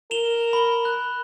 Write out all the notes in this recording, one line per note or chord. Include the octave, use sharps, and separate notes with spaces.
A#4 E7 F7 G7
B5 G7
F#6